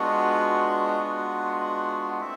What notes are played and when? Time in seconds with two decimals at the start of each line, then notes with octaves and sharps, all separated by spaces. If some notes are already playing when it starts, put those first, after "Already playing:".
Already playing: G#3 B3 D4 F4 F#4 F#5
0.98 F#4 F#5
2.20 A3 C4 E4 E5